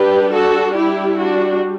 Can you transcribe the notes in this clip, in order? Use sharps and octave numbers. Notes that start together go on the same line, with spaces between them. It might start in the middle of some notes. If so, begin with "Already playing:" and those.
Already playing: G3 D4 G4 B4
F#4 A4
E4 G4
D4 F#4